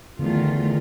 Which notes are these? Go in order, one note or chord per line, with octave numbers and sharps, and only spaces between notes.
E2 D3 D#3 A3 F4